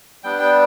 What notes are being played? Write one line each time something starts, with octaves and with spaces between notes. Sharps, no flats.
G3 B3 D4 G5
G5